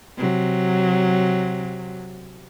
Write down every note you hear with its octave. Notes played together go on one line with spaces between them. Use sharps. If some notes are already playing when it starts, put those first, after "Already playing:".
C3 F#3